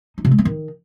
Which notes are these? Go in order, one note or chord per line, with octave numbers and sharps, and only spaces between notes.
D#4
C3
G#3
B3
D#3